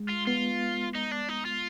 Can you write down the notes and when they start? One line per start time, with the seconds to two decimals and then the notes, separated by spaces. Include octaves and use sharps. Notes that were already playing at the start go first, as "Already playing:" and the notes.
Already playing: G#3
0.09 F4
0.27 B3 F4
0.95 D#4
1.11 D4
1.29 D#4
1.45 F4